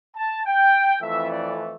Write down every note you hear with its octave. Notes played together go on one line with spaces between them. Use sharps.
A5
G5
F2 E3 A3 E5
D5